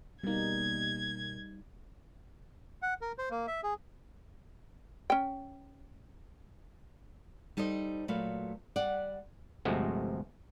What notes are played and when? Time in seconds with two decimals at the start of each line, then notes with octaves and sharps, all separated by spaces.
0.23 B2 G3 A#3 D#4 G#6
2.82 F#5
3.01 A#4
3.19 C5
3.31 A#3
3.47 E5
3.63 G#4
5.10 C#4 G5
7.57 G3 D#4 A4 C5 D#5
8.08 A#2 F#3 A3 B4 F5
8.76 G3 D5 F#5
9.65 G1 C3 F3 G#3 A3 F#4